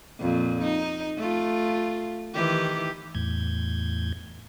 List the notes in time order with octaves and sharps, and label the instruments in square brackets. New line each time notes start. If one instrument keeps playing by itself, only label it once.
[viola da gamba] F2 A#2
D#4
A3 F4
D#3 E3 G4
[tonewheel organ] E2 A2 G6 G#6